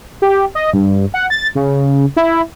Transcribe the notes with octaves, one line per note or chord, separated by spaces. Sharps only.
G4
D#5
G2
F#5
A6
C#3
E4